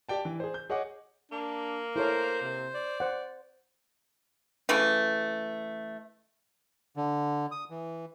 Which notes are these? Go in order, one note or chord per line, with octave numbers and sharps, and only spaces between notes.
G4 D5 G5 A5
E3
G#4 C5
G6
G#4 C#5 D#5 F#5 D6
A#3 D4
E4 A4 A#4 C5 C#5
C3
D5
C5 F#5
C#3 E3 A3
D3
D#6
E3